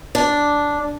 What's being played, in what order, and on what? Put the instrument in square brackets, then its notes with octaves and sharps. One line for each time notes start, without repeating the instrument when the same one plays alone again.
[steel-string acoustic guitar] D4